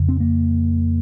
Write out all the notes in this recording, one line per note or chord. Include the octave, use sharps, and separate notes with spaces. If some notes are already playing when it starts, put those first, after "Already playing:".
Already playing: F2 C#3
C4
A#3